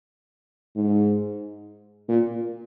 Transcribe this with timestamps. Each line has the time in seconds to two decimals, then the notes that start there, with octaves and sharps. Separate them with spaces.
0.76 G#2
2.09 A#2